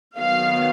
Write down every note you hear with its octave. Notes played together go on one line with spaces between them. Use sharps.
D#3 F#3 B3 F5